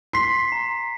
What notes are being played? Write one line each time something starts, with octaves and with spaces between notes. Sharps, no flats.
C6 B6 C7
A#5